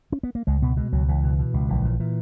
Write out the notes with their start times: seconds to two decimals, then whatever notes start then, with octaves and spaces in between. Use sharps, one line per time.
0.12 C#4
0.23 B3
0.35 A#3
0.47 C#2 G#3
0.62 B2 B3
0.77 B2 G#3
0.92 C#2 F#3
1.08 C#2 E3
1.24 B2
1.39 B2
1.54 C#2
1.69 A#1 E3
1.85 A#2
2.00 A#2 E3